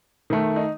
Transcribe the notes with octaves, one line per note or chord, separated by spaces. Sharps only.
D#3 A3
D#4